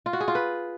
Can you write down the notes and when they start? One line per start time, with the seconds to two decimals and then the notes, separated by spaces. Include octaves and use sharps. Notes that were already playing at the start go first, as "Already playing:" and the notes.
0.06 F4
0.13 F#4
0.20 G#4
0.28 F4
0.35 B4